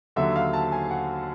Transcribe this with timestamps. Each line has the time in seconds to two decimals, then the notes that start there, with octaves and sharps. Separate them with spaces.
0.16 D#2 D3 F#3 E5
0.36 F5
0.53 A5
0.72 G#5
0.91 F#5